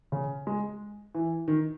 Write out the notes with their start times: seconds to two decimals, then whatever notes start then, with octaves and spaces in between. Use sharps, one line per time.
0.12 C#3
0.47 G#3
1.15 E3
1.48 D#3